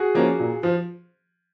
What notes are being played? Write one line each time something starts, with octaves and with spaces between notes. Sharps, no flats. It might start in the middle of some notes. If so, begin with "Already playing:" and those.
Already playing: F#4 G#4
F3 A#3 C#4
A#2
F3